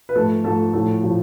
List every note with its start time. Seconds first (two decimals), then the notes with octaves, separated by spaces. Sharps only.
0.09 B4
0.15 G#2 F3 A3 A4
0.44 G#2 F3 A3 A4
0.74 A2 F3 A3 A4
1.03 A2 F3